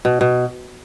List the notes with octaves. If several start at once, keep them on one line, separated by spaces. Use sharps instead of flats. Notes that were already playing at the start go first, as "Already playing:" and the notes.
B2
B2